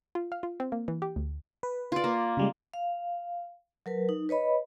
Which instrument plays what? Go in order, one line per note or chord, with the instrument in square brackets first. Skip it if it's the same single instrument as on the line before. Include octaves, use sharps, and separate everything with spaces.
[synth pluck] F4
F5
F4
C4
A#3
E3
G4
D2
[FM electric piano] B4
[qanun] F4 D5
A#3
[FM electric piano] C#3 G3 G#3
[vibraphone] F5
F#3 A#4 B4
D#4
B4 C#5 D#5 B5